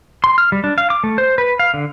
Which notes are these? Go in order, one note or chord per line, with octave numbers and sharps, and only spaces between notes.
C6
F6
G3
D4
F5
D6
A3
C5
B4
F5
D3